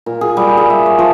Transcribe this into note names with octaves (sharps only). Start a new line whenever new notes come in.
A#2
G#4
G3
G#4
E5
C#5
F3